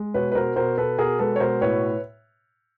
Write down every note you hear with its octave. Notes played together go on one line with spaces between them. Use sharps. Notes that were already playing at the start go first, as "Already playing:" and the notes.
Already playing: G#3
B2 B4 C#5
B4
B2 A#4 C5
B2 A#4 C5
B2 A4 B4
B2 G#4 A#4
G#3 A4 B4
C#5
B2 A#4 C5
A2 B4 C#5